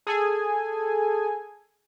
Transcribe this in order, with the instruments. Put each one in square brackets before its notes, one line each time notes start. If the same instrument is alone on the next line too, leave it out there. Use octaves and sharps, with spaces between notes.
[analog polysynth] G#4 A4 G#5